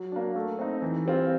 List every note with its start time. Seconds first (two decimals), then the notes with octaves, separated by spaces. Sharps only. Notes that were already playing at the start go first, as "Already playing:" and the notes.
Already playing: F#3
0.12 A#3 D4
0.36 A3
0.59 C4 D#4
0.82 E3
1.05 G3 C4 F4